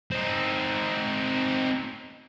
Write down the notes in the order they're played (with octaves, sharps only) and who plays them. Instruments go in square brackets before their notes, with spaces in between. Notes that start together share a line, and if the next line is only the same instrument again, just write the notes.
[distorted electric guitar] C4 D#4